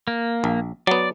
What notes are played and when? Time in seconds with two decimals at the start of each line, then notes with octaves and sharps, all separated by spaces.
0.08 A#3
0.44 A#1
0.87 F#3 B3 D5